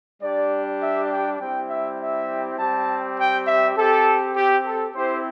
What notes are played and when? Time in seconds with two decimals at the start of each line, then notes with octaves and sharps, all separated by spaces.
0.22 G3 D4 G4 D5
0.81 E5
1.10 G5
1.40 G3 C4 E4 G4 G5
1.70 E5
2.00 E5
2.58 G3 C4 G4 A5
3.18 G5
3.47 E5
3.76 C4 G4 A4
4.36 G4
4.65 A4
4.95 C4 E4 G4 C5